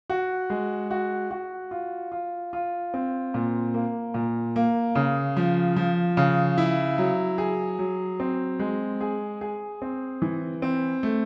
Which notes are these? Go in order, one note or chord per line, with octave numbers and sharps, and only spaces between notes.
F#4
G#3
F#4
F#4
F4
F4
F4
C4
A#2
A#3
A#2
A#3
C#3
F3
F3
C#3
E4
F#3
G#4
F#3
C4
G#3
G#4
G#4
C4
E3
C4
A3